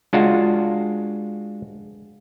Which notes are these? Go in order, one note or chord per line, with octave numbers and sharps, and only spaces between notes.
G#3 D4 F4 F#4